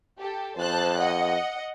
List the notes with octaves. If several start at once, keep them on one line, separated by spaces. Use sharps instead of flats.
G4 A4
F2 C5 A5 F#6
D#5 F#5